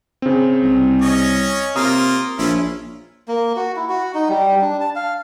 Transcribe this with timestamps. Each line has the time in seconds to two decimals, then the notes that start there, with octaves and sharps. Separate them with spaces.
0.22 C#3 C4
0.63 C2
1.02 C#4 C#5 D#5
1.76 C3 A#3 F4 A#5 D#6
2.39 A#1 C#4 E4 F4
3.28 A#3
3.56 F#4
3.76 E4
3.89 F#4
4.14 D#4
4.29 G3
4.61 D4
4.80 A5
4.96 F5